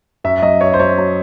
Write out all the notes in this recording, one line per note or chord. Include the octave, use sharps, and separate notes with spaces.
F#2 E5
F#3 D#5
F#2 C#5
C5
F#3 C#5
F#3